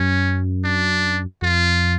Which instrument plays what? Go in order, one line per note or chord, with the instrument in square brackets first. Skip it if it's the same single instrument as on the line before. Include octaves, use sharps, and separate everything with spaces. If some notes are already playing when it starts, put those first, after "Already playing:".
Already playing: [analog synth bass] F#2 [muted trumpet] C#4
[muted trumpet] D4
[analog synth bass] F2 [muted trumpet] F4